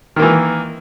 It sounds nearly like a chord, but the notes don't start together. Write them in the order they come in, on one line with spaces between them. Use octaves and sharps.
D#3 A#3 E3